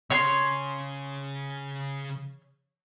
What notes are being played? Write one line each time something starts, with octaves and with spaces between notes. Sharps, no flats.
C#3 C#5 C6